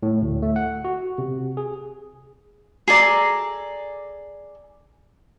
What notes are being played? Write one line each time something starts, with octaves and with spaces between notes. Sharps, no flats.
A2
D2
A3
F#5
F#4
C3
G#4
G#4 A4 D5 A#5